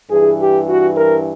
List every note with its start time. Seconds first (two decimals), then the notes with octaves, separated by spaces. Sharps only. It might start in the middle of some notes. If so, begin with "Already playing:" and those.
0.10 G2 E3 G#4
0.40 G4
0.68 F#4
0.97 A#4